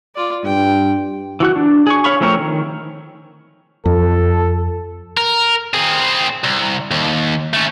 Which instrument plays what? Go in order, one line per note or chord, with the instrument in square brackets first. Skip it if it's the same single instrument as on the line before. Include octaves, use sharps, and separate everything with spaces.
[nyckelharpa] F4 D5
[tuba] G2 [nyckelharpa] G5
[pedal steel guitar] E3 F#4 F#6
D4
G#4 C#6
C#5 F5 B5 C#6
F3 A3 C4 A#4 C#5
D#3
[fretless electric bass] F2 [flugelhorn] A4
[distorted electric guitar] A#4
C4 G#4
C2
D#2
A3 C#4